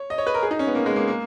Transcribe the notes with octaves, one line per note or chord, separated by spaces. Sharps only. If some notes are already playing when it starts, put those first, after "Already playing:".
Already playing: C#5
D#5
C#5
B4
A#4
G#4
D#4
C#4
B3
A#3
G#3
A#3
A#3